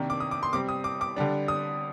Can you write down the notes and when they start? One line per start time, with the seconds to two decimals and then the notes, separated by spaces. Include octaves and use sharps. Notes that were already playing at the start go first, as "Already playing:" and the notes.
Already playing: C3 D#3 A#3 D4
0.10 D6
0.20 D#6
0.31 D6
0.43 C6
0.53 C3 G3 C4 D6
0.69 D#6
0.84 D6
1.01 D6
1.16 D3 G3 D4
1.48 D#6